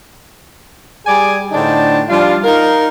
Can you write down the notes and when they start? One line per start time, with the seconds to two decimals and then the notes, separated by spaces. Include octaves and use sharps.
1.06 G3 G#4 D5 G#5
1.51 A2 D3 D4 D#4 C5 A5
2.09 F3 G3 D4 F4
2.44 D#4 A#4 F5